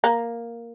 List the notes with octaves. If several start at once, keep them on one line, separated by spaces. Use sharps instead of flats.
A#3